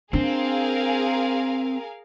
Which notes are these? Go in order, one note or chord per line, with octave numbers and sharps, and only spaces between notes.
C4 D4 G#4 A#4 F5